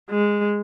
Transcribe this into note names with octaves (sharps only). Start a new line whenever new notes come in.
G#3